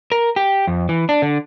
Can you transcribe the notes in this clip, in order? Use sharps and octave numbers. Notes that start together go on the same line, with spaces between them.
A#4
G4
F2
E3
D4
D3